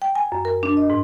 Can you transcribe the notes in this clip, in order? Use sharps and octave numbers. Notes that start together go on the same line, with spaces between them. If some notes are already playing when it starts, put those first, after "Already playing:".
G5
G#5
F#2
A#4
D4
D#5
G#2